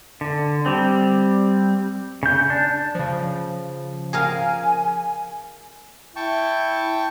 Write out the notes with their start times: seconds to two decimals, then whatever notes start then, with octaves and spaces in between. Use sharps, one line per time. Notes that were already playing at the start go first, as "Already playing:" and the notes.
0.21 D3
0.66 G3 C4
2.23 C#3 G6
2.50 D4
2.95 C#3 F3
4.13 G#4 A#4 F5 G#5
6.16 E4 G5 A5 C#6